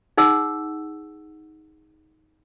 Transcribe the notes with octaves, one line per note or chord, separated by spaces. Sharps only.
D#4 G#4 F#5 E6